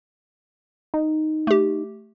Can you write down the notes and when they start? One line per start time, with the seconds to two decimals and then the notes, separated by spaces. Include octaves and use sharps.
0.94 D#4
1.47 A3 G4